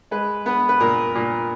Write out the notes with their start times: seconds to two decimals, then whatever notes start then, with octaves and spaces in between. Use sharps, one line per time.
0.11 G#3 B4
0.46 B3 B4
0.69 B4
0.80 A#2 A#4
1.15 A#2